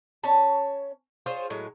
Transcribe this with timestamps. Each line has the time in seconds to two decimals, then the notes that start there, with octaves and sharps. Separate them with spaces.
0.24 C#4 C#5 A5
1.26 F4 G#4 C5 C#5
1.50 A2 F#3 G#3